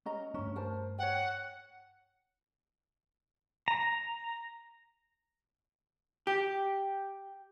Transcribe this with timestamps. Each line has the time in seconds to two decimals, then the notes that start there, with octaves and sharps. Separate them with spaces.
0.06 C#4 D#5 A#5
0.34 G2 A3 C#4 D4
0.56 A#4 C5 A5
0.98 C#5 F#5 G5
3.68 A#5
6.27 G4